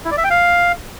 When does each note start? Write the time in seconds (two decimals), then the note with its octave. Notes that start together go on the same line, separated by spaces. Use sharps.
0.05 E4
0.11 D5
0.18 E5
0.24 G5
0.30 F5